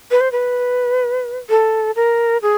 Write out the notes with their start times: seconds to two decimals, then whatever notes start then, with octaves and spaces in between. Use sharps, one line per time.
0.11 B4
0.21 C5
0.32 B4
1.49 A4
1.96 A#4
2.42 G#4